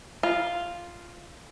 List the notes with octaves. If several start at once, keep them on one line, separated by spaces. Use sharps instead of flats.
F4